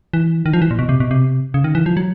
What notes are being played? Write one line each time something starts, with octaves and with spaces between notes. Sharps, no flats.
E3
D#3
F3
E3
A#2
B2
C3
B2
C3
C#3
D#3
E3
F3
F#3